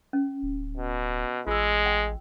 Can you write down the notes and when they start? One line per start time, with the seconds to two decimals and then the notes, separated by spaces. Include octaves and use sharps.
0.13 C#4
0.43 D1
0.77 B2
1.47 A1 G#3 F4 G#4 E6
1.86 G5